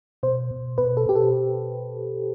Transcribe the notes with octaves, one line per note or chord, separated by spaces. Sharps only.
B2 C5
B2
B2 B4
A4
B2 G4
A4